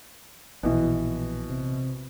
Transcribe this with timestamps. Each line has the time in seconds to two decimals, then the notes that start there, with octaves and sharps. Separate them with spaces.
0.63 A#1 B2 E3
1.50 C3